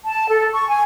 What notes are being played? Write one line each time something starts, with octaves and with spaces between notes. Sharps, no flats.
A5
A4
C#6
G#5